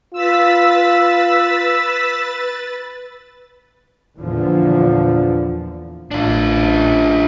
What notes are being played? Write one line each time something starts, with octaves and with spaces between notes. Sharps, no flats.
F4 B4 E6 A6 B6
E2 A#2 D3 E3 F3
A1 D4 F4